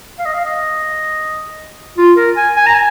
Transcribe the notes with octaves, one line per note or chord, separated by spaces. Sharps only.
F5
D#5
F5
D#5
F4
A#4
G#5
G#5
A#5
G#5